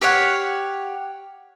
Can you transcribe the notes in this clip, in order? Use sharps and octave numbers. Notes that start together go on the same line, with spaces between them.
G4 C#5 F5 F#5